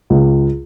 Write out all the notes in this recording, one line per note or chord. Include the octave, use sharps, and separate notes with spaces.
C#2